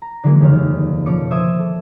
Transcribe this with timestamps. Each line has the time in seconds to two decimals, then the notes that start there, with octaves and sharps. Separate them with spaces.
0.02 A#5
0.23 D3 E3 F#3 G#3 A#3
0.41 F1 D#2 C#3 F5 F6
1.06 B2 F3 C#4 D6 C#7
1.31 C5 E5 D6 D#6 G#6
1.59 A4